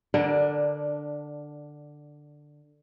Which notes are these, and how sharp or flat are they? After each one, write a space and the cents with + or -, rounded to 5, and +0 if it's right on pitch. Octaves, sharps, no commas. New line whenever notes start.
D3 +10 D4 +0 A#4 +30